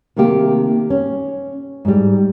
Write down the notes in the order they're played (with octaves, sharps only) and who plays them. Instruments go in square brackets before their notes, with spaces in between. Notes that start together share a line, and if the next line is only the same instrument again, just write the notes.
[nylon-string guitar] C3 D#3 A3 A#3 G4
C#4
G#2 G3